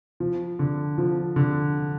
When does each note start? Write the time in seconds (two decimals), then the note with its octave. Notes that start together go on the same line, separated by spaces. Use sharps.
0.20 F3
0.59 D3
0.98 F3
1.36 D3